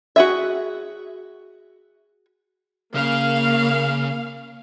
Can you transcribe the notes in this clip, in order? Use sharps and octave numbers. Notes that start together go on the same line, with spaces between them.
F#4 G#4 E5
C#3 A#3 F5